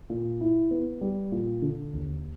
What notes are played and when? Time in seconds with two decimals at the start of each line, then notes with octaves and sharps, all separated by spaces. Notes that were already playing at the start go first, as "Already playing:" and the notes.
0.10 A#2
0.41 E4
0.71 B3
1.01 G3
1.32 A#2
1.62 D3
1.93 D#2